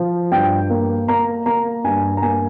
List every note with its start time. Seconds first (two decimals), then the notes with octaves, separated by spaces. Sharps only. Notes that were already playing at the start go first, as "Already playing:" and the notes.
Already playing: F3
0.32 G2 G5
0.70 A#3
1.08 A#3 A#5
1.46 A#3 A#5
1.84 G2 G#5
2.17 A#5
2.22 A#3 G#5